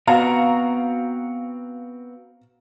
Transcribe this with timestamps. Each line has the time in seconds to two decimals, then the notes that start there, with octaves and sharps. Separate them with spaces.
0.07 B3 C4 F#4 F5 A#5